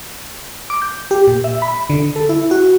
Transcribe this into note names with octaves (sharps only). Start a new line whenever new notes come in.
D6
G6
G4
A#2
E5
B5
D3
A4
E4
F#4